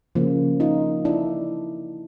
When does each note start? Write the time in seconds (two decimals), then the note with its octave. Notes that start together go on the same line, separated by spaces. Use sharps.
0.15 C#3 F3 A#3
0.60 D#4 F4
1.05 D4 E4